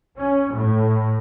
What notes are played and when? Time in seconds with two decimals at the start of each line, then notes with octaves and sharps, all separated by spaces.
0.18 C#4
0.52 A2